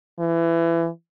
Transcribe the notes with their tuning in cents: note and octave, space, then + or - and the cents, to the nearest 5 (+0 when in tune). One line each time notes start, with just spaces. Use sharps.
E3 +25